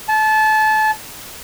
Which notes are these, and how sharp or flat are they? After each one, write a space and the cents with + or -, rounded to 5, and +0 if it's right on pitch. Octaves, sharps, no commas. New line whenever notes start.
A5 -25